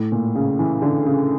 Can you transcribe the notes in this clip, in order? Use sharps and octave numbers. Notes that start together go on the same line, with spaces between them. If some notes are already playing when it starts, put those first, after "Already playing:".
Already playing: A2
A#2
C#3
E3
D3
C#3